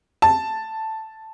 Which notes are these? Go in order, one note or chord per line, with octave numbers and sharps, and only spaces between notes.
A5